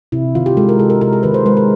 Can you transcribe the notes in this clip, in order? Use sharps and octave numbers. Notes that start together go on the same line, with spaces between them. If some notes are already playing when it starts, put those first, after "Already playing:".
C3 E4
D#3 F4
G4
G#3 A4
A#4
C3 A4
A#4
C3 A#4
G#4
D#3 B4
C5
G#3 B4
A#4